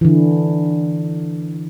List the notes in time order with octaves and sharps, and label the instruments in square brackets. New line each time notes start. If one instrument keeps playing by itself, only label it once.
[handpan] D3 E3